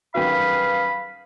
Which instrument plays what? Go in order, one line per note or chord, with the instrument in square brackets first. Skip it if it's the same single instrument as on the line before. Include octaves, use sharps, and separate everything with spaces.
[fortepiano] F#2 D#3 F#4 [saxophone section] G3 G#4 B4 [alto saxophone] F5 [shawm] B5